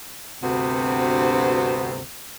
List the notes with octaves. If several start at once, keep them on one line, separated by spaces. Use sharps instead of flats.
D2 G2 C3 B3 C4 F#4